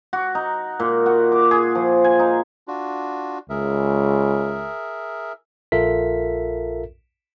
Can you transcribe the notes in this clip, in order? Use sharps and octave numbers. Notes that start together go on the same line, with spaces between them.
F#4
D#4
A#2
F#4
D6
G#4
F3
G#5
D#4
D4 F4 F#4
C#2 G#4 A#4 E5
A#1 F4 A4 A#4 E5 B6